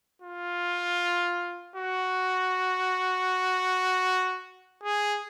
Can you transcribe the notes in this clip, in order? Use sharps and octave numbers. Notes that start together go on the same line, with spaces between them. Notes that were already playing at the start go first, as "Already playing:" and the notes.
F4
F#4
G#4